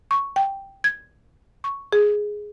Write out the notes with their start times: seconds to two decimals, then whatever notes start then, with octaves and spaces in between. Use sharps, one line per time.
0.11 C#6
0.36 G5
0.84 G#6
1.64 C#6
1.93 G#4